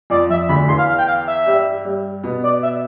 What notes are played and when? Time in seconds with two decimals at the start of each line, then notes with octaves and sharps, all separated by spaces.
0.10 F2 F3 D5
0.30 F2 F3 E5
0.49 D2 D3 B5
0.68 E2 E3 C6
0.78 F5
0.89 F5
0.98 G5
1.07 F5
1.27 E5
1.46 G2 G3
1.85 G2 G3
2.23 B2 B3
2.43 D5
2.63 E5